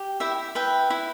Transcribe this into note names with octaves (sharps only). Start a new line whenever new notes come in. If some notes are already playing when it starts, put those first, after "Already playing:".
Already playing: G4
E4 E5 G5
B4 E5 G5
E4